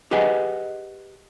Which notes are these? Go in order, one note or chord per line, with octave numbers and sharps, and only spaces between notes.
G4 G#4 B4 D#5 F#5 G#5